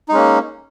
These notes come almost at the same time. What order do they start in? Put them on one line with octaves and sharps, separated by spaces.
D#4 G#3 C#4 A#3